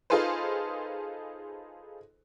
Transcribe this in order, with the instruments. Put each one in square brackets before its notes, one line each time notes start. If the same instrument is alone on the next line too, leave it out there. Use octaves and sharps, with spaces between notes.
[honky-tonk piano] D#4 F4 G#4 A4 B4 C5